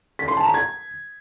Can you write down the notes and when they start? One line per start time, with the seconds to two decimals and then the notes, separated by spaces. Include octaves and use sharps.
0.19 B6
0.28 C6
0.37 A5
0.45 A#5
0.54 G#6